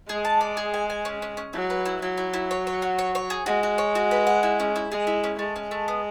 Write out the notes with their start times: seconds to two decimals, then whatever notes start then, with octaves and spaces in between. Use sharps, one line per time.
0.09 G#3 G#4
0.25 A5
0.41 D5
0.57 G#4
0.74 G#5
0.90 G#5
1.05 C#4
1.22 C#4
1.37 C#4
1.53 F#3 E4
1.70 B4
1.86 E4
2.02 F#3 E4
2.17 E4
2.33 E4
2.51 C#5
2.67 C#5
2.82 F#4
2.98 C#5
3.15 C#5
3.30 G#4
3.46 G#3 F#4
3.63 F#4
3.78 C#5
3.95 F#4
4.11 B4
4.27 F#5
4.43 E4
4.60 C#4
4.76 E4
4.91 G#3 G#4
5.07 E4
5.24 C#4
5.39 G#3 A3
5.56 C#4
5.71 A3
5.88 B3